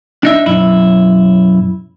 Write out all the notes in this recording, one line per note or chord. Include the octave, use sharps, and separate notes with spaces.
D4 D#4 E5
B1 F#2 E4